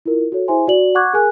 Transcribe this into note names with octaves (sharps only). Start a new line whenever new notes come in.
E4 F4 A#4
F#4 A4 C#5
E4 G#4 C5 E5 G#5 C6
F#4 D5 F#7
F#5 C#6 D6 F#6 G#6
G#4 A#4 G#5 F#6